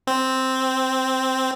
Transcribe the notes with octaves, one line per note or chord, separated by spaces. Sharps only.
C4